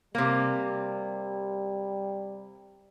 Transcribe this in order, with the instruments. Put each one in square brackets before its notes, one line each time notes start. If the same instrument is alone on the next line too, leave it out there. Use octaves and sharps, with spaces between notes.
[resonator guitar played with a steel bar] C3 A#3 [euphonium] G3